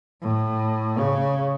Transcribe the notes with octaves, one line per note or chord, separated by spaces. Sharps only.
A2
C#3